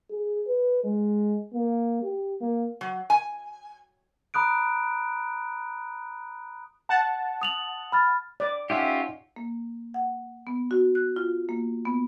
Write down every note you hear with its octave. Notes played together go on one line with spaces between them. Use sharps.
G#4
B4
G#3
A#3
G4
A#3
F#3
G#5
A#5 B5 D#6 F#6 D7
F#5 A5
D#6 F7 F#7
B5 F6 A6
D5
C#4 D#4 F4 G4 D#5 E5 F#5
A#3
F#5
B3
F#4
F#6
F4
A#3
B3